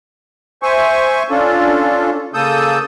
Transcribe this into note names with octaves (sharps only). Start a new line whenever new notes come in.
C5 E5 G#5 C#6
C#4 D4 F4 A4
C#3 A#3 A4 D#6 E6 G6